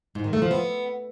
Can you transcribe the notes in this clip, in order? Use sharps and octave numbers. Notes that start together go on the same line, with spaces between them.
G#2
D#3
A3
F3
B3